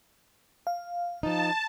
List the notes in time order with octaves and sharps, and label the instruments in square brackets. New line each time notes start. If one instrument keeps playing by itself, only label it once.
[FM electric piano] F5
[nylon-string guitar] F3 D#4 [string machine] A5